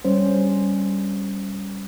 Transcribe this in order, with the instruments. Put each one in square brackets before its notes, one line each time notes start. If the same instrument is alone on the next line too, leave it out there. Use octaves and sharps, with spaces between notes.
[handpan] G3 C#4 C5